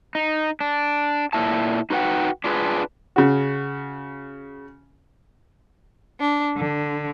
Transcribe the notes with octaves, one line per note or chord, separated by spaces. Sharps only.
D#4
D4
A#2 E4 A5
D#4 F#4 B4 F#5 G5
D4 F4 G#4 B4
C#3 F#4
D4
D3